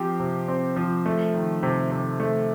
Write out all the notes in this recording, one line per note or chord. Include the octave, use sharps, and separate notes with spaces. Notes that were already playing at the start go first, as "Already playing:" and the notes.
Already playing: F3 C4 G4
C3
C4
F3
A3
D#3
C3
C3
A3